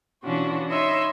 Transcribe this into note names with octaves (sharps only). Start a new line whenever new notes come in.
B2 E3 C#4 D4 F4 F#4
D#4 C#5 D#5 E5 B5 C6